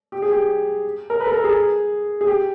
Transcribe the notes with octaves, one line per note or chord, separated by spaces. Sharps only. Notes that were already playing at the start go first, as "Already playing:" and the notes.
G4
G#4
G4
A#4
B4
A4
A#4
G#4
G#4
G4